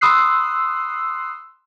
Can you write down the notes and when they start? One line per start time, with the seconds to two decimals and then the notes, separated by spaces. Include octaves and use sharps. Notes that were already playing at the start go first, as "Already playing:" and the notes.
0.01 B5 C6 D#6 E6 F#6 C7